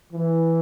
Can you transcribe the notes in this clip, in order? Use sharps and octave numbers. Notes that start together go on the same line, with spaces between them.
E3